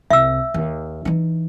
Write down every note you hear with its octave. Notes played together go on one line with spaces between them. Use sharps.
C2 E5 E6
D#2
E3 D#4